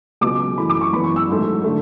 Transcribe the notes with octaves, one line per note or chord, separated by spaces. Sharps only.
C#2 B2 F#3 B3 D6
F#2 E3 A3 B5
D6
C#6
G#1 F#2 E3 B3 B5
C#6
E6
A1 G#2 F#3 A3
D3 A3